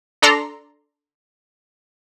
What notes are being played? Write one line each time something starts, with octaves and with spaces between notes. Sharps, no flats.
D4 A4 D5 A#5 C6